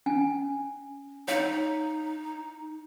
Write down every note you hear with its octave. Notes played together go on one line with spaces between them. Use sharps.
C#4 G#5
D#4 C#5 F5